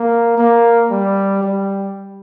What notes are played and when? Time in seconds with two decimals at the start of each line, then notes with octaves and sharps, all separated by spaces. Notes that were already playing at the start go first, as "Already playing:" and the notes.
Already playing: A#3
0.38 A#3
0.91 G3
1.43 G3